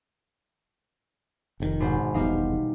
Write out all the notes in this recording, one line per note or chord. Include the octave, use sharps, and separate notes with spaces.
F1 C3 D#3
G#1 B2 C5
E1 A#1 G3 B3 D#4 F5